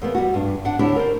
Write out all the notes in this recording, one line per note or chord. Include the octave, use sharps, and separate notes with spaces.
E2 A#3 B3
G3 F#4
G2 D4
D4 F#5
D2 D4 E4 G4 C#5
A#4 C5